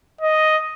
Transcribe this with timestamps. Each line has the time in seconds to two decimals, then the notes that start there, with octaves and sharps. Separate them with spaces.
0.21 D#5